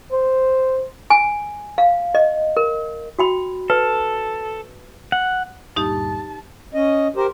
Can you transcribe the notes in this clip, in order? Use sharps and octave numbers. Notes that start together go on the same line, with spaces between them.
C5
G#5
F5
D#5
A#4
F#4 G5 B5
A4 B4
F#5
D2 G2 A#2 D#4 G4 A5
C#4 D#5
G4 A#4 C5